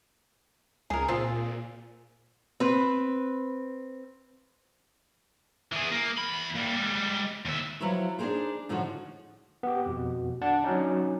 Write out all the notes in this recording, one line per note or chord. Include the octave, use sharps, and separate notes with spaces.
C#2 G#4 A#4
A#2 C4 F4 G#4
C4 B4
E3 G#4
A#3
E2 B5
G3 A#3
G3 G#3
D#2 E5
F3 F#3 E4 B4 C#5
D4 D#4 G4 G#4 A#4 C5
A2 D3 F3 C#4 D#4 F#4
B3 G4
F2 B2
D4 F#5 A5
F#3 C#4 D#4